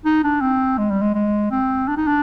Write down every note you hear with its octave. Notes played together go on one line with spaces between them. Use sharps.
D#4
D4
C4
G#3
G3
G#3
G#3
C4
D4
D#4
D4